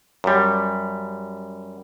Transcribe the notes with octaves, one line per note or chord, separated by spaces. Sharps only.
F#2 G3